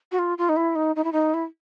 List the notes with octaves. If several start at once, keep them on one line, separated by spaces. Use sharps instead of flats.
F#4
F4
F4
D#4
E4
D#4
D#4
E4
D#4
E4